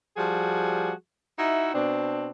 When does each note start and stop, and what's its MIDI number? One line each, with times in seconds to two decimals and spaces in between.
0.17 0.92 53
0.17 0.92 55
0.17 0.92 66
0.17 0.92 68
1.38 1.73 63
1.38 1.73 64
1.38 1.73 66
1.38 1.73 76
1.74 2.29 47
1.74 2.29 60
1.74 2.29 62